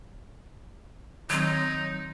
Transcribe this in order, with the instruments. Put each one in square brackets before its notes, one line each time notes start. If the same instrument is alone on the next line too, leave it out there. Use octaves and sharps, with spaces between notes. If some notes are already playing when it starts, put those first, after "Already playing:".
[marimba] D#3 C4 [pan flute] F#3 [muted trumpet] D#4